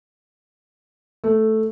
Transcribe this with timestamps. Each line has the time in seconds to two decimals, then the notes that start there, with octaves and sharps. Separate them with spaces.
1.24 A3